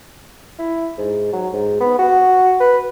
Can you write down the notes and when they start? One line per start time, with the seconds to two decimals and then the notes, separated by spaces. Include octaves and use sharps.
0.59 E4
0.98 G#2
1.33 F#3
1.53 G#2
1.80 B3
1.98 F#4
2.60 B4